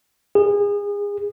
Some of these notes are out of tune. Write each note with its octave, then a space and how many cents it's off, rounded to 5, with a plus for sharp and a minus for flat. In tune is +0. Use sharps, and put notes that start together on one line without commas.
G#4 -30